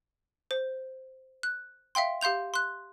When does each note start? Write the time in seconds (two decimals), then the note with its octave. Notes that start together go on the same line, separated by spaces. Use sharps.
0.51 C5
1.43 F#6
1.95 E5 F5 G5 C6
2.21 G4 F5 C6 G6 F7
2.54 C6 F#6